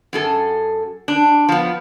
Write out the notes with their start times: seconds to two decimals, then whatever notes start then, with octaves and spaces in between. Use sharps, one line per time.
0.13 F#2 G#4 A4
1.08 D4
1.49 F3 B3